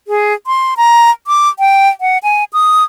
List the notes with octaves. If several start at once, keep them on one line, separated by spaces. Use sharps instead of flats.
G#4
C6
A#5
D6
G5
F#5
G#5
D#6